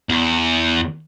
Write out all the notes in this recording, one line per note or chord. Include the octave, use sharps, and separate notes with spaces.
E2